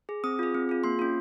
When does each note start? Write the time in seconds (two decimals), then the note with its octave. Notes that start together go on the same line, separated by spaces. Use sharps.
0.09 G#4
0.24 C4 D#6
0.39 F4 G#4
0.54 C4
0.69 F4 G#4
0.84 A#3 C6
0.99 C#4 F4